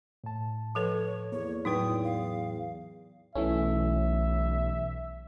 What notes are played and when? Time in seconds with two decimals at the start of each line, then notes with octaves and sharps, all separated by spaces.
0.24 A2 A5
0.75 F3 A4 B4 C#5
1.32 E2 A#3 C#5
1.65 A2 F#3 D#4 E4 B4 G5 D#6
2.04 F5
3.35 B1 E3 A3 C#4 E5